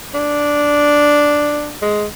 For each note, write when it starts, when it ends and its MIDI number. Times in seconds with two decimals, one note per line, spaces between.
0.14 1.74 62
1.82 2.06 56